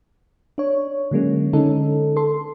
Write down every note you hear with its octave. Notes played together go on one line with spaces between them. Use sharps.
D4 C#5
D3 F#3 G#3 A#3 C#4
D3 G#3 C#4 D#4 A4
A4 C6